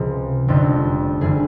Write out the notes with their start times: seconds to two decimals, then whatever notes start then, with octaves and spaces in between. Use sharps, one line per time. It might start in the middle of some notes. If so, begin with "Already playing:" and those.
Already playing: C#2 C3 F3 G#4
0.48 F1 F2 D3 G3
1.21 F1 D3 G3 G#4